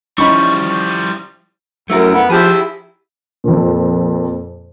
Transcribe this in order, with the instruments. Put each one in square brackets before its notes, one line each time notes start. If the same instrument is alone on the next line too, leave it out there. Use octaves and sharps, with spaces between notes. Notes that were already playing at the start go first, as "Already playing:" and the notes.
[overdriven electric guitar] F3 G3 [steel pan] C#4 D#4 B5 [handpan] E4 [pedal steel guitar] C#6
[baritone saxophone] F#2 [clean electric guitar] A3 E4 A#4
[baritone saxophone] B3
[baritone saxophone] F3 [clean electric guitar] E4 G4 G#4
[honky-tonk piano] F2 A#2